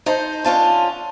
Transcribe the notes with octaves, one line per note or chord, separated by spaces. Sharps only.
D#4 A4 C5
D3 C#4 F4 A5